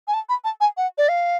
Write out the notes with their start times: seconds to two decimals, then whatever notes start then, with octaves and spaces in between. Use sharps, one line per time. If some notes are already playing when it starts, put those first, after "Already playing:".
0.07 G#5
0.14 A5
0.29 B5
0.44 A5
0.60 G#5
0.77 F#5
0.98 D5
1.09 F5